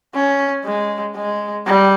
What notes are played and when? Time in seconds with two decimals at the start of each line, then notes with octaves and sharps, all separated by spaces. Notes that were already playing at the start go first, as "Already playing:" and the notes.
0.15 C#4
0.65 G#3
1.16 G#3
1.67 G3